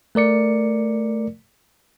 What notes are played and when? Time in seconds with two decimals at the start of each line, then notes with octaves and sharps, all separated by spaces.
0.15 A3 A#4 D5 C#7